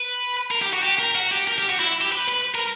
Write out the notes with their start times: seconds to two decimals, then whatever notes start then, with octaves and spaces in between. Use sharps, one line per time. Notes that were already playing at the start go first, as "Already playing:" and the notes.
Already playing: B4
0.51 A#4
0.62 G4
0.73 F#4
0.83 G4
0.99 A#4
1.15 F#4
1.31 G4
1.48 A#4
1.58 G4
1.69 F#4
1.80 E4
2.01 G4
2.12 B4
2.29 B4
2.55 A#4